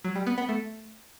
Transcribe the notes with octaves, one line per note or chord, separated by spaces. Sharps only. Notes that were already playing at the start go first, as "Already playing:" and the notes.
F#3
G3
B3
B3
A3